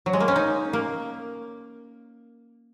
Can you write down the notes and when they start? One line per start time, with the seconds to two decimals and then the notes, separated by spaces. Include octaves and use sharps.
0.06 F#3
0.13 G#3
0.20 A#3
0.28 C#4
0.36 D#4
0.73 A#3